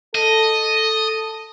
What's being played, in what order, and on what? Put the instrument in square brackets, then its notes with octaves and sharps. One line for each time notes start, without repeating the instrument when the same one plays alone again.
[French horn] A4 [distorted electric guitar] D#5